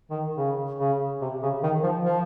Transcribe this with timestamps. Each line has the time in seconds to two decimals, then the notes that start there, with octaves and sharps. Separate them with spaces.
0.10 D#3
0.37 C#3
0.80 C#3
1.21 C3
1.42 C#3
1.63 D#3
1.83 F3
2.05 F3